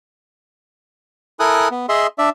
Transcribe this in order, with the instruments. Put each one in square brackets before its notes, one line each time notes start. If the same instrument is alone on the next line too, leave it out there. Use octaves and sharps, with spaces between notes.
[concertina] E4 A4 A#4 G#5 D#6 F#6
B3
G#4 D#5 E5 C6
D4 D5 E5